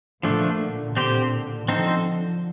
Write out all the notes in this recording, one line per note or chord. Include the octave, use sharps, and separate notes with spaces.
A#2 D3 F3 A3 D4
A#2 D3 C4 G4 C5
D3 F3 C4 D#4 A4 C5